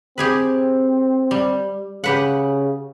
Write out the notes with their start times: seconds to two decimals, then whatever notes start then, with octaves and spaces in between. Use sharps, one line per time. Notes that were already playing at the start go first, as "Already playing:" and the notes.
0.18 C4 G4 G#4 B4
1.31 G3
2.04 C#3 G4 B4 F#5